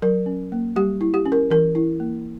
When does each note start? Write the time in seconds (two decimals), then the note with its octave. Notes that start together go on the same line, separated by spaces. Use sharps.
0.02 F#3 A#4
0.26 C#4
0.52 A#3
0.76 G3 G4
1.01 E4
1.14 G4
1.26 C#4
1.32 A#4
1.50 E3 A#4
1.75 E4
2.00 A#3